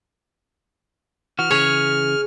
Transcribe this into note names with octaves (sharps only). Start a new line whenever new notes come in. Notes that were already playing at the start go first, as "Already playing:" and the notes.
E3 F#4 F6
C#3 E3 G#4 C#5